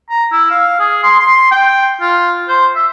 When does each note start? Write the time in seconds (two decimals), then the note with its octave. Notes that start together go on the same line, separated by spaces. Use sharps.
0.10 A#5
0.31 E4
0.51 F5
0.79 G#4
1.03 C6
1.19 C6
1.51 G5
2.01 F4
2.48 C5
2.75 E5